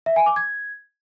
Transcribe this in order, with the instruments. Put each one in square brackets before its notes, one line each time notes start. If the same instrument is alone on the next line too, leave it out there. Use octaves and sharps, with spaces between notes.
[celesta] E5
G#5
D6
G#6